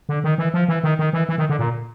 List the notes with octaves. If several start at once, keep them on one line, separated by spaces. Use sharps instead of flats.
D3
D#3
E3
F3
E3
D#3
D#3
E3
E3
D#3
D3
A#2